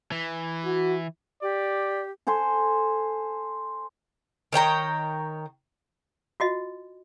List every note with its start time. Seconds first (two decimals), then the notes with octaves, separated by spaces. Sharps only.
0.12 E3
0.65 F#4
1.42 G4 D5
2.27 A4 C5 G#5 C6
4.52 D#3 C#5 G5 A#5
6.40 F4 F#4 D#5